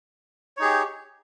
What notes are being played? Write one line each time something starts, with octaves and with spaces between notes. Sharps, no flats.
D#4 G4 G#4 C#5